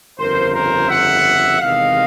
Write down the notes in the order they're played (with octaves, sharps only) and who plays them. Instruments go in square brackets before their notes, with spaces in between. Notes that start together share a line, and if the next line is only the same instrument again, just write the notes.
[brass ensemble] G1 F2 C#3 A#4 C5
A#4 C5
E5 F#5
E2 C3 D#3 G#3 D#5 F5